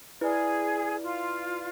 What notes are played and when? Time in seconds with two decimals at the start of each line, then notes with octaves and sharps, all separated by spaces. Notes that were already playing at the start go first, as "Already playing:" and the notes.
0.21 E4 G#4 B4 D5
1.03 F4